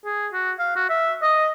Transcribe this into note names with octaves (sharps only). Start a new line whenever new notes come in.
G#4
F#4
F5
F#4
E5
D#5